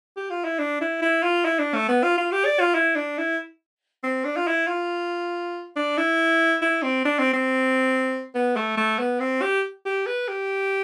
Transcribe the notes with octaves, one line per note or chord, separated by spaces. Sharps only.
G4
F4
E4
D4
E4
E4
F4
E4
D4
A3
B3
F4
F4
G4
D5
F4
E4
D4
E4
C4
D4
F4
E4
F4
D4
E4
E4
C4
D4
C4
C4
B3
A3
A3
B3
C4
G4
G4
B4
G4